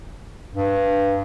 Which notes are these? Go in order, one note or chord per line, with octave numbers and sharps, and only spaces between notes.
G2